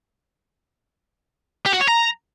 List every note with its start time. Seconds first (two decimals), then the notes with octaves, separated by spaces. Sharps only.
1.66 G4
1.73 F#4
1.81 C#5
1.88 A#5